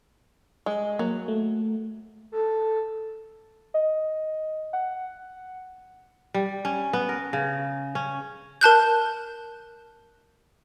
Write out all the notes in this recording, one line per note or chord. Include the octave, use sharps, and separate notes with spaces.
G#3
F#3 A#3
A3
A4
D#5
F#5
G3
C#4
B3
A#4
C#3
C#4
A#4 A5 F#6 G6